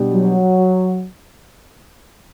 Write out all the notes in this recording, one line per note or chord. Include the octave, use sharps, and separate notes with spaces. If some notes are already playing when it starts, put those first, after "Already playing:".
Already playing: B2 G3 D4 G4
F#3